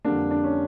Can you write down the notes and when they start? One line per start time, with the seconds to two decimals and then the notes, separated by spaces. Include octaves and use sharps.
0.05 F2 D3 G3 A#3 D4
0.31 D4
0.44 C#4